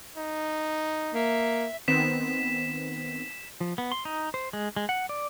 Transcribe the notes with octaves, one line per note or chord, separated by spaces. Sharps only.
D#4
A#3 E5
D#3 B3 C4 B6 E7
F3
B3
C6
D#4
C5
G#3
G#3
F#5
D5